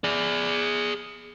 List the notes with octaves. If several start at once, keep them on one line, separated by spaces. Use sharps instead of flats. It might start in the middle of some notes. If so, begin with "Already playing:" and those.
G#4 D5